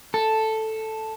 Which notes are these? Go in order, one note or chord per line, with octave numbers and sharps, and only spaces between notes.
A4